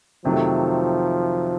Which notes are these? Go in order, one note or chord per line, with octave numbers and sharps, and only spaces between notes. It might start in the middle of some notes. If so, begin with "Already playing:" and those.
F2 C3 D#3 F3 F#3 A3